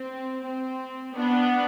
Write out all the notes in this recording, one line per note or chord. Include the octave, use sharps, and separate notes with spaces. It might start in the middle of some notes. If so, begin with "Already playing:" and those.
Already playing: C4
C4
B3 D4